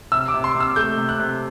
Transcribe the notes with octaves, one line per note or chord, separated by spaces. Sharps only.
C3 E6
D6
C3
C6
C3
E6
A3 G6
C3
F#6
C3